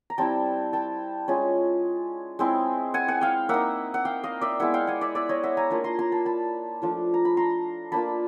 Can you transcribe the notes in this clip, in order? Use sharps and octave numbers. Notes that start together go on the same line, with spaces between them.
A#5
G3 C4 E4 G5 A5
G5 A5
G#3 C#4 F4
G#3 C4 E4
F#5 G#5
F#5 G#5
F5 G5
A#3 D#4 E5 F#5
F#5
F5 G5
D#5 F5
D5 E5
G#3 B3 E4 E5 F#5
F5 G5
F#5 G#5
D5 E5
D5 E5
C#5 D#5
E5 F#5
G#5 A#5
A#3 D4 F4
A#5 C6
A#5 C6
A5 B5
A5 B5
F3 A3 D4 F4
A#5
B5
A#5 C6
A#3 D4 F4 A5 B5